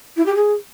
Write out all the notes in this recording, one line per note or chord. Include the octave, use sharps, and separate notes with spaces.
E4
G4
G#4